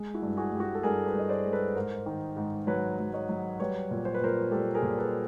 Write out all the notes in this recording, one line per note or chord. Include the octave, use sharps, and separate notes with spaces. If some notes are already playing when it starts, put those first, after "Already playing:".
Already playing: G#3
E4 F#4
G2
F#4 G#4
G2 G4
F#4 G#4
A4
G2 G#4 A#4
A4 B4
G2 D#5
C5 D5
G#3
A4 B4
G#2 A#4 C5
D#3
G#2
F#3 B4 C#5
F#3
C#5 D#5
F#3
G3 B4 C#5
A#2
C5
B4
A#2 A#4 C5
G3 G4 A4
G#4 A#4
A#2
A4 B4